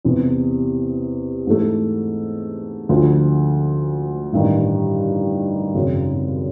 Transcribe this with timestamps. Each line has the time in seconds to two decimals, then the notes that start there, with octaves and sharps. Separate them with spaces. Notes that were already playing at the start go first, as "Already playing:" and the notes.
0.05 E2 C3 E3
1.47 G#2 E3 A3
2.89 D2 D3 F3
4.32 A1 G2 D#3
5.74 G#1 F#2 C#3